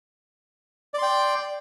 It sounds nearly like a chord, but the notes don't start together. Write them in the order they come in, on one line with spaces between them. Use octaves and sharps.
D5 C6 G5